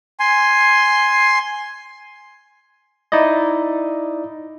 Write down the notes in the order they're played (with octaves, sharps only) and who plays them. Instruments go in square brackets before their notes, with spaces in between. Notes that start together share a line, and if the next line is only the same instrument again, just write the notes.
[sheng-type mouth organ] G#5 C6
[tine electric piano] D#4 E4 D5 D#5